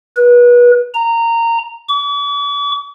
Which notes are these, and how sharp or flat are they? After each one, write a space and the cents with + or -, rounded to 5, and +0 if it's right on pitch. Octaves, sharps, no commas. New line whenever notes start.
B4 -30
A#5 -15
D6 -45